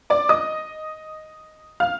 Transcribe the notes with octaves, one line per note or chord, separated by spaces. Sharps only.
D5 D6
D#5 D#6
F5 F6